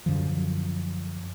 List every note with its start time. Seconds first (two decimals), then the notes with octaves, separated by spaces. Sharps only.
0.06 F#2 D3 F3